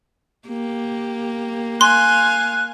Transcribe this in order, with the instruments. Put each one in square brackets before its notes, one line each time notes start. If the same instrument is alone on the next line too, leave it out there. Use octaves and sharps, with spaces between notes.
[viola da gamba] A#3 [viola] G4
[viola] F5 G#5 [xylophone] C6 [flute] F#6